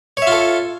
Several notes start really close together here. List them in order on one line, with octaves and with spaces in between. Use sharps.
C#5 E5 F4 A4